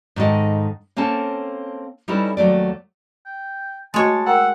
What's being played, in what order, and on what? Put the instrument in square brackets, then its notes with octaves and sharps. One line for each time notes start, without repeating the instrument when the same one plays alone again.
[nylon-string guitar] G#2 D#3 D#4 A4 D#5
A#3 C4 C#4 A4 A5
G3 C#4 D#4 E4 A4 B4
D#2 F#3 A3 D5
[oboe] G5
[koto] G#3 C#5 [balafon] A3 F#4 D#5 [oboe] A5
[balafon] A#4 G5 A#5 [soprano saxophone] F#5 [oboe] E6